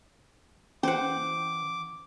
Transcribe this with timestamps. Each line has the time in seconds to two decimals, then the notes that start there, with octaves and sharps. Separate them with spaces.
0.83 E3 C#4 C5 F#5 D6